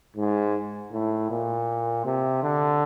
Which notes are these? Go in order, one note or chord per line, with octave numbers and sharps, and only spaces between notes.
G#2
A2
A#2
C3
D3